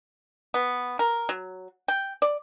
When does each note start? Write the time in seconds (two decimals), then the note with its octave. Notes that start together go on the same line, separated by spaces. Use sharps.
0.54 B3
0.99 A#4
1.29 F#3
1.88 G5
2.22 D5